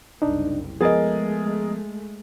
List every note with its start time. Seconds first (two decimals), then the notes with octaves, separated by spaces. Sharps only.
0.22 F#1 C2 D4 D#4
0.81 F3 G#3 A3 B3 G#4 A#4 D#5 A6